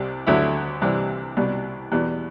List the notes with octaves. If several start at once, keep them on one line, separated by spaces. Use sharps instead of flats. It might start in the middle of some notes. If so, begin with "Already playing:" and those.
Already playing: C2 C3 G3
D2 D3 F#3 E4
C2 C3 E3 G3
C2 B2 G3
E2 B2 G3